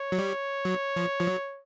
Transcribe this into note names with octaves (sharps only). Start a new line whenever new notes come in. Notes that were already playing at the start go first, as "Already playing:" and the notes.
Already playing: C#5
F#3
G3
F#3
F3
F3
F#3